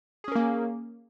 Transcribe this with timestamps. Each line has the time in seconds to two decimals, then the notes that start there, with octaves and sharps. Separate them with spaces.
0.24 G#4
0.28 C#4
0.32 A#4
0.35 A#3